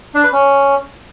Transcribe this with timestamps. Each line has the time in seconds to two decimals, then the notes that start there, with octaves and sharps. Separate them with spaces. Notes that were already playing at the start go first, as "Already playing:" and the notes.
0.15 D4
0.24 B4
0.33 C#4